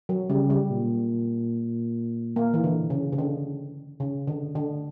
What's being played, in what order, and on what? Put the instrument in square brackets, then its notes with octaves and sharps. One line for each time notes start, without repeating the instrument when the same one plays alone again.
[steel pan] F#3
[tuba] C#3 [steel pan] G3
[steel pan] G3
[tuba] A#2
[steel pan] A#3
E3
D3
C#3
C#3
D3
C#3
D3
D3